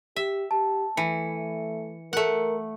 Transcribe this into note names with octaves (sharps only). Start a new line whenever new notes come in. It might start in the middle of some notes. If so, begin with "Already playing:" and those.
G4 E5
G4 A5
E3 A3 C#7
A3 A#4 F#5